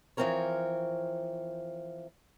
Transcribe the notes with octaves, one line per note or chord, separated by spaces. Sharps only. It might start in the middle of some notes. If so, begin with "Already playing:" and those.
E3 F3 B3 C4 A#4 C#5